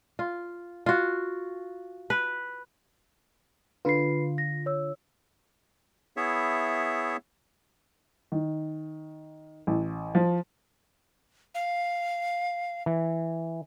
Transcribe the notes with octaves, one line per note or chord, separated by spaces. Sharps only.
F4
F4 F#4
B4
D3 F4 B4 B5 C7
A#6
C#5 E6
B3 E4 G#4 C#5 E5
D#3
A1
F3
F5
E3